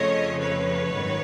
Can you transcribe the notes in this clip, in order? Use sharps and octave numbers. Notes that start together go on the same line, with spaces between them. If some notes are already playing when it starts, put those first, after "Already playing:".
Already playing: F2 C#3 F3 A3 C#5 D#5
B4 C#5
G#1 F#2 D#3